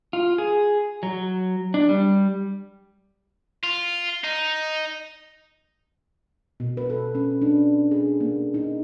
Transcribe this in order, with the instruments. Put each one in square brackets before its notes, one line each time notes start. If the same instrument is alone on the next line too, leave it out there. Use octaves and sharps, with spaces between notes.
[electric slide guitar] F4
G#4
F#3
D4
G3
[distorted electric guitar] F4
D#4
[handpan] B2
B4
A4
C#4
D4
G#4
A#3
D#4